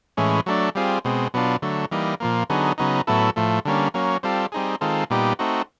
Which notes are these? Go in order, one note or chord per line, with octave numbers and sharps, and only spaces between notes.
A2 E3 G#3 C#4
F#3 A3 D4
G3 C4 F4 G#4
B2 G#3 C4
B2 F#3 B3 D4 F4
D3 F#3 A3
E3 G3 A#3 D#4
A#2 F3 A#3
D3 F#3 B3 D#4 G#4
C#3 F#3 B3 D#4
A2 F#3 B3 E4 A4
A2 F3 A3
D3 G3 A#3 C#4
F#3 A#3 C#4
G3 C4 F4 A4
G3 C4 D#4 G#4
D#3 G#3 C4 F4 A4
A#2 G3 B3 D#4 G4
A3 C4 D#4 F#4